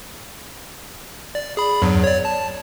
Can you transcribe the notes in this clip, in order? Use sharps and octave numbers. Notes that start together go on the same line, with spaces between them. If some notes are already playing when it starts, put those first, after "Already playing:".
D5
G#4 B5
E2 G2 F#3
C#5 D5
A5